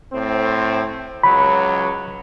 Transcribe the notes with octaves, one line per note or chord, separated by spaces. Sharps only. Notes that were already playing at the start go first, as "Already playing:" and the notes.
A2 C4
C#2 F#3 B5